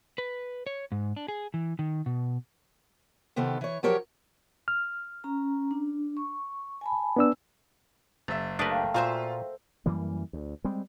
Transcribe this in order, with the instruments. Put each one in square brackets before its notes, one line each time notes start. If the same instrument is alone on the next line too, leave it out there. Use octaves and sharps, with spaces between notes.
[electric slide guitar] B4
C#5
G#2
D4
G#4
E3
D#3
B2
[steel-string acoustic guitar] C3 D#3 B3 F4 A4
E3 C#5
F3 F#3 G4 A#4 C#5
[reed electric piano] F6
[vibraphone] C#4 A#5
D4
C#6
G#5 A5 B5
[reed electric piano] B3 D4 E6
[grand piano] F#1 E5 [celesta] A6
[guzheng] A3 A#4 [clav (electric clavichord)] D4 G4 B4 [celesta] D#6
[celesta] F5 G5
[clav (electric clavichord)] A#2 [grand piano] F4 [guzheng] F#4 C5 E5
[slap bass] F#2 E3 G3 A#3
D2
G3 G#3 C4